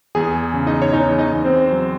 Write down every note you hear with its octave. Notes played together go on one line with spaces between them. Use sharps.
E2 G#4 G#5
C#3
D#4 D#5
C#5
E2 D#4 D#5
D#4 D#5
E2
C4 C5
F#3